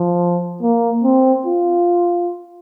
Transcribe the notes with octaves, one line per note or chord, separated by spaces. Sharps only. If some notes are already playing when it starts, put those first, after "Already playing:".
Already playing: F3
A#3
C4
F4